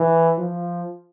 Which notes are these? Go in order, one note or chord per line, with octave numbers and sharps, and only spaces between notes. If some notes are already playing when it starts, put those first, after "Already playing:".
Already playing: E3
F3